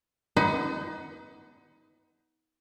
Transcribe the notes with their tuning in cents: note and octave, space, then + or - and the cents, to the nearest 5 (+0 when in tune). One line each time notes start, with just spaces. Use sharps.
B3 +0 D#4 +30 B4 +40